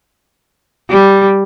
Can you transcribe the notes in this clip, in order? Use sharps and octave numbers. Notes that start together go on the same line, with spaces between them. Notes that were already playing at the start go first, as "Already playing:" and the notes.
G3